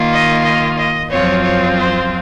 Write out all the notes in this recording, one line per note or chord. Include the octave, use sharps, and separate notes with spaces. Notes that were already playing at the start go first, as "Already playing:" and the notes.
Already playing: D#3 A#3 F4
D#5
D#5
D#5
F#2 F3 C4 F4 C#5
C#5
C5